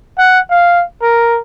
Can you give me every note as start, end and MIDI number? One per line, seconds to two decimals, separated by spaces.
0.18 0.40 78
0.51 0.84 77
1.02 1.39 70